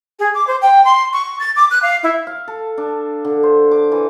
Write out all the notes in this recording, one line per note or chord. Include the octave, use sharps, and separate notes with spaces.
G#4
D6
C5
G5
C6
C#6
A6
D6
F#6
F5
E4
F5
A4
D4
D3
C5
D6
E3